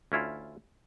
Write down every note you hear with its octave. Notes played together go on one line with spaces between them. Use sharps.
D2 C#4 E4 F4